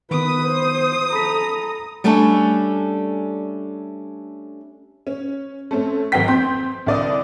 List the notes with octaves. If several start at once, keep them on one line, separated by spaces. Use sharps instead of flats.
D#3 B3 B4 D#6
C5
A4 A#5 B5 B6
G3 A3 C#4 D4 A4
C#4
A3 C4 C#4
G#1 F#3 B4 G5 B6
F2 C4 C6 G6
C2 D3 D5 D#5 D#6